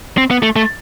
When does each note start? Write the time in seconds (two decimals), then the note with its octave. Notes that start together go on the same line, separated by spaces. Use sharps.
0.18 C4
0.31 B3
0.43 A3
0.56 A3